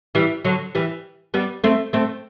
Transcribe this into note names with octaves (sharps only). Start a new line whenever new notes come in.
E3 G3
D3 F#3
E3 G3
G3 B3
A3 C4
A3 C4